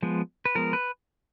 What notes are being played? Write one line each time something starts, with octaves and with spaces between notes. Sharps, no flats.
F3 G#3 B3
B4
F3 G#3 B3 A#4
B4